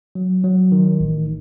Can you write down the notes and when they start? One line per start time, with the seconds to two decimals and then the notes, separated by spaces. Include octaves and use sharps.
0.15 F#3
0.44 F#3
0.72 D#3
1.00 A1